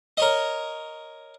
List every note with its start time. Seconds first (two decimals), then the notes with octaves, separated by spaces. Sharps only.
0.17 A#4 C#5 D#5